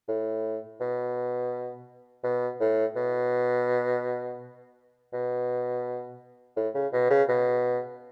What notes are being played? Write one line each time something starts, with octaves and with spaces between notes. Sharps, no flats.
A2
B2
B2
A2
B2
B2
A2
C#3
B2
C#3
B2